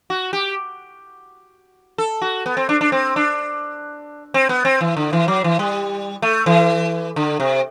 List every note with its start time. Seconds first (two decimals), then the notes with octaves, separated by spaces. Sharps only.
0.10 F#4
0.33 G4
1.98 A4
2.22 F#4
2.46 B3
2.57 C4
2.69 D4
2.81 D4
2.92 C4
3.16 D4
4.34 C4
4.49 B3
4.65 C4
4.81 E3
4.97 D3
5.13 E3
5.28 F#3
5.44 E3
5.59 G3
6.22 A3
6.46 E3
7.16 D3
7.40 C3